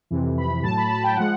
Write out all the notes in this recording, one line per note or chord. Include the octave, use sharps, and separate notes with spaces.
F2 C3 E3
B5
A2 F#3 A5
B5
A5
G5
F3 G#3 F#5